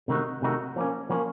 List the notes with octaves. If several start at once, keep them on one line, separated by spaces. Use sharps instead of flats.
C3 D#3 A3 D#4 F#4
C3 D#3 A3 D#4 F#4
F3 A#3 C#4
F3 A#3 C#4